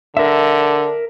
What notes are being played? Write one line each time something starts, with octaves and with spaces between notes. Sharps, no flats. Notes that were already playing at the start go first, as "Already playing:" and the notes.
D3 A#4 E5